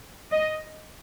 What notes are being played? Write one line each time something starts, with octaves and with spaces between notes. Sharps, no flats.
D#5